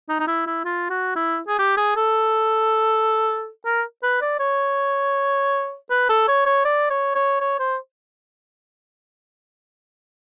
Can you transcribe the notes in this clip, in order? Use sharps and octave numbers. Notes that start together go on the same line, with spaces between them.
D#4
D#4
E4
E4
F4
F#4
E4
G#4
G4
G#4
A4
A#4
B4
D5
C#5
B4
A4
C#5
C#5
D5
C#5
C#5
C#5
C5